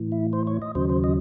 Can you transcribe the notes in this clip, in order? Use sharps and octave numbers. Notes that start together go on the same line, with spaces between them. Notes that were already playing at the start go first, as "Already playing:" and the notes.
Already playing: A2 E3
E4
C5
C#5
D#5
D#2 C#3 F#3 C5
C5
D#5